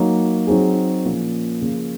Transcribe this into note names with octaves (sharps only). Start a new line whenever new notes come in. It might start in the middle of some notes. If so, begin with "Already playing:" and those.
Already playing: F#3 A#3 D#4
F#3 C4 D#4 G#4
A#2 F3 A#3 C#4
C#3 F3 A#3